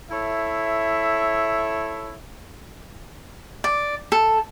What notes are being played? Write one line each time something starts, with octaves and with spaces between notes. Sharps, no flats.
E4 A4 C#5 E5
D5
A4